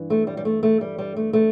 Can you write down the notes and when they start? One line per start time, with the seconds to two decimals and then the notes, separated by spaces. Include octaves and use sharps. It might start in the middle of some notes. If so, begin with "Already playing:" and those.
Already playing: G2 E3
0.10 A3
0.27 G3
0.37 G3
0.45 A3
0.63 A3
0.81 G3
0.99 G3
1.16 A3
1.33 A3